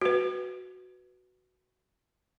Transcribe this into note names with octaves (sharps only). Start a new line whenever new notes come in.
F#4 B4